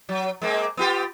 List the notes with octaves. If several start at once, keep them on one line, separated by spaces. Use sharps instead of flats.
F#3
G#3 A#3 C4
B3 F4 G4